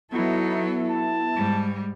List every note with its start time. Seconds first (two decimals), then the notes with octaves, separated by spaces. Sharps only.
0.12 F#3 B3 D#4 E4 A4
0.90 A5
1.36 G#2 G3